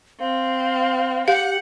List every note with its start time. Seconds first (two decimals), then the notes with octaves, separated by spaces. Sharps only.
0.20 C4 F5
1.28 G4 F5 F#5 G6